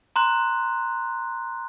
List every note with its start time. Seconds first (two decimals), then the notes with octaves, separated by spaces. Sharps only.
0.16 A#5 C6 F#6